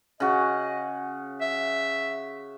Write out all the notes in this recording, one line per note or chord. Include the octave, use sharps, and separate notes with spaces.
C#3 F#4 D#5
E5